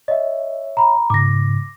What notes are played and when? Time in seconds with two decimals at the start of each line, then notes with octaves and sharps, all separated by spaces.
0.08 C#5 D#5 E5
0.77 A#5 B5
1.10 G#2 C#3 D6 A#6